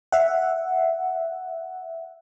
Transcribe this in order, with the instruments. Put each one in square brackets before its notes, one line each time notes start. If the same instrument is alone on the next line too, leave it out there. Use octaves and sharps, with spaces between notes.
[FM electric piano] E5 F#5